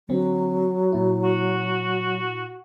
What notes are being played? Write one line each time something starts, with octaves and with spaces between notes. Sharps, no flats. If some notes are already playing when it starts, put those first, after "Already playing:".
D3 F#3 C4
A#2 E4
F#4